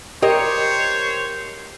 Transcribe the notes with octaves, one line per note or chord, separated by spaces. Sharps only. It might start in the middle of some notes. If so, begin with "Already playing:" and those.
G4 A#4 C5 C#5 D#5